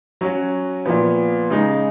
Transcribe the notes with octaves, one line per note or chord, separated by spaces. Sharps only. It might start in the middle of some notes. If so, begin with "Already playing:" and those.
F#3 C#4 F#4
A#2 F3 B3
C#3 G#3 D#4